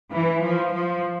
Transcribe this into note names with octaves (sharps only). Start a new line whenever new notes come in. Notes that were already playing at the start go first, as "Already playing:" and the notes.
E3
F3
F3